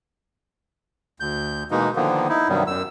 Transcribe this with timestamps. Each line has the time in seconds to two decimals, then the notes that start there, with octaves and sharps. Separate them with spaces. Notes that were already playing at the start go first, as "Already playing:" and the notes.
1.20 D2 G6
1.71 B2 E3 G#3 A#3 D#4
1.96 D3 D#3 F3 A#3 B3
2.29 D#4 E4
2.49 G2 C3 D#3 F#3 G3 B3
2.67 F#2 E6